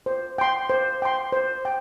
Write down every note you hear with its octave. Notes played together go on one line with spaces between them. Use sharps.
C5
G5 C6
C5
G5 C6
C5
G5